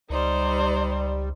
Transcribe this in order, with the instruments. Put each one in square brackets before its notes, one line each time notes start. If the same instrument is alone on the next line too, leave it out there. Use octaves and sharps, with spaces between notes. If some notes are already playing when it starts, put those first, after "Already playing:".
[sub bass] C#2 [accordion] G3 [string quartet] D#4 C5 D5